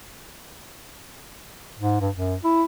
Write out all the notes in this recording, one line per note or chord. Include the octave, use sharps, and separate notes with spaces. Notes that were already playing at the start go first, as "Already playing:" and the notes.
G#2
G2
F#2
E4